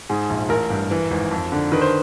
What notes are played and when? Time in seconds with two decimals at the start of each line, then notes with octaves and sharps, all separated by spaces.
0.09 G#2 G#4
0.30 A#1
0.49 A1 A#4
0.70 G2
0.91 E3
1.11 G#1
1.31 F2
1.52 D3
1.72 D#3 B4
1.82 C5